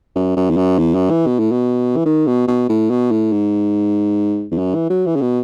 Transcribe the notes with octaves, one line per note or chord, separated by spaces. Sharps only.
F#2
F#2
E2
F#2
E2
F#2
E3
B2
A2
B2
E3
D#3
B2
B2
A2
B2
A2
G#2
E2
F#2
E3
F#3
E3
C#3
B2